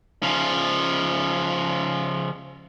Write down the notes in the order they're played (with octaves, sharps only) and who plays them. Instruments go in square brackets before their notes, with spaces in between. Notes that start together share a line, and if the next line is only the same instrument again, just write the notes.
[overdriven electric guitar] C#3 F3